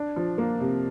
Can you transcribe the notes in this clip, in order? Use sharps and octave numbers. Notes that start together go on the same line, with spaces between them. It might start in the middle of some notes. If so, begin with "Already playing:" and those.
Already playing: D4
F3
A#3
C3